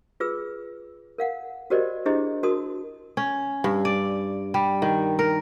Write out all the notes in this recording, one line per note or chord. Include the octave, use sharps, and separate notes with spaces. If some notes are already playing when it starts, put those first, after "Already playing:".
F4 G#4 B4 E6
A#4 F5 F#5
F#4 G4 A#4 C5 D5 D#5
D4 E4 G4 G#4 C5 D#5
F#4 A#4 A5 C6 D#6
C#4
G2
D5
G3
D#3
A#4